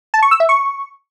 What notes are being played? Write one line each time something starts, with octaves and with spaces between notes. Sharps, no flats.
A5
C#6
E6
E5
C#6